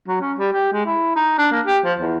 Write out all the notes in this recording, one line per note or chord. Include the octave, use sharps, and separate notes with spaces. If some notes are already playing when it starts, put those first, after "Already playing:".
F#3
C#4
G3
G4
G#3
E4
D#4
D4
A#3
G4
F3
E2